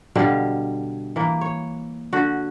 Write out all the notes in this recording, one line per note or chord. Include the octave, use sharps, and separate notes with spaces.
B2 D3 G3 F5
E3 A#3
C#5
D3 F#4